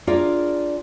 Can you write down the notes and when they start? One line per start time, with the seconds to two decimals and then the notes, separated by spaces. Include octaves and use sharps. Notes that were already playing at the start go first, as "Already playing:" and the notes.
0.07 D4 F4 G#4 A#4 D5